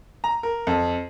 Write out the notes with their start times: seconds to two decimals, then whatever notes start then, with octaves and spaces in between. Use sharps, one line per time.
0.24 A#5
0.43 A#4
0.67 F2